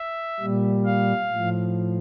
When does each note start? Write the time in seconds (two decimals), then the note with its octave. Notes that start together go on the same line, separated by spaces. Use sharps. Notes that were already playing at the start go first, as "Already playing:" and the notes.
Already playing: E5
0.40 A#2 G3
0.86 F5
1.31 A2 F3